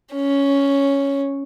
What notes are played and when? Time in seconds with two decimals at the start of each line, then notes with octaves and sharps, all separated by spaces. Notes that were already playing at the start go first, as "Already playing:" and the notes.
0.14 C#4